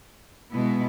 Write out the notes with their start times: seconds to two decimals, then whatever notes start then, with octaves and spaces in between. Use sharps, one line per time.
0.53 B2 G#3 B3 E4